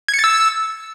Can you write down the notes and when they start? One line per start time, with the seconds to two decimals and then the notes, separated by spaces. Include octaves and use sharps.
0.08 G#6
0.14 C#7
0.19 A6
0.24 E6